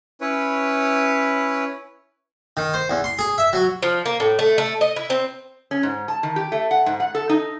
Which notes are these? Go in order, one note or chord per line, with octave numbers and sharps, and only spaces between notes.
C#4 E4 B4 C#5
D#3
C5
E2
C6
G#4
E5
F#3
F3
A#3
A2
A3
A3
D#5
E4
C4
C#4
G#2
A5
D#3
G4
A3
F#5
G#2
F#5
A4
D#4